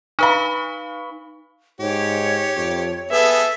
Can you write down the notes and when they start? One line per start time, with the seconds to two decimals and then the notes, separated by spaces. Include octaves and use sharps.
0.19 D#4 B4 F5 B5 C#6
1.80 G#2 G4 C#5
2.56 F2
3.11 B3 G#4 A4 B4 E5